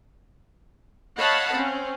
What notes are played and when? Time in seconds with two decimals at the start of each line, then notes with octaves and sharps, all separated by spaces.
1.18 C#5 D#5 F5 F#5 A5 B5
1.54 C4 C#4